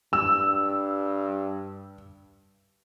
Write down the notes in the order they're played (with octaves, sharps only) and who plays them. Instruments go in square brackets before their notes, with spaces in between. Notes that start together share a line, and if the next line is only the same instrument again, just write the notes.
[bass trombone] G2 [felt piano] E6